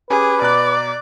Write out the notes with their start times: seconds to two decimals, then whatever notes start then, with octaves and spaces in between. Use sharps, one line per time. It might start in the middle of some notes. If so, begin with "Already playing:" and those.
0.10 C#4 G4 G#4 B4 G#5 D6
0.42 B2 D5 A#5 F#6